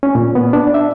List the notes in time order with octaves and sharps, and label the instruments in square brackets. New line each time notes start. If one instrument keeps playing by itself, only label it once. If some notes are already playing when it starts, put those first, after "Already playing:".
[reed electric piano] C#4
A#2
B3
D4
E5